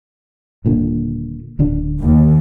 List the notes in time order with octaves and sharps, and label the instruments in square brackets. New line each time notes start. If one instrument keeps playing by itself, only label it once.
[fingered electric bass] D#1 A#2 D3
D1 D3 D4
[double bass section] D#2